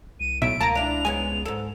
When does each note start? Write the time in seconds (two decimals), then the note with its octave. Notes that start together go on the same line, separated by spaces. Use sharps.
0.20 C2 D#7
0.42 B1 A2 E5 D7
0.61 C#2 A#3 A#4 A5 A#5
0.75 D4 E4 F7
1.05 G#3 B3 C#4 G#5
1.46 G#2 A4